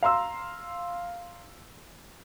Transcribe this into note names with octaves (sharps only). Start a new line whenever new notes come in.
F5 A#5 C6 E6